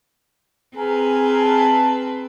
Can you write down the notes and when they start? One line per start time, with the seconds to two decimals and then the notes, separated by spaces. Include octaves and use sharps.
0.77 C4 G#4 B4 G#5 A#5 F6
1.38 A5